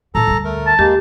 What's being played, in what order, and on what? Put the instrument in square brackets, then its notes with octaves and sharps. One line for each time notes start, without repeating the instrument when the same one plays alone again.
[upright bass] A2 D#3 [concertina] A4 A#5
[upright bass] D2 G3
[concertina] A3 A#4
[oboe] A5
[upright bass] D#2 [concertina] G#3 A#3 [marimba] G4